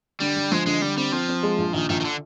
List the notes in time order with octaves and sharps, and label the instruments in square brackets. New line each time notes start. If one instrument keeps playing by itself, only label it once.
[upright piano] D3 [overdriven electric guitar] G3
[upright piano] D3
[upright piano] F3 [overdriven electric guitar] G#3
[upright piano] D3 [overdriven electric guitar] G#3
[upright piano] D3 [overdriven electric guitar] G3
[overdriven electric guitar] G3 [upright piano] C4
[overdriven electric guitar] F3 [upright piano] C4
[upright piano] C4
G#3
A#1
[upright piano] A#1 [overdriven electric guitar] D#3
[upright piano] A#1 [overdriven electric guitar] D#3
[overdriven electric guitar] D#3
D3